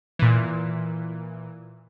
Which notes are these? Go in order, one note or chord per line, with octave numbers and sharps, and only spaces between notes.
A#2 E3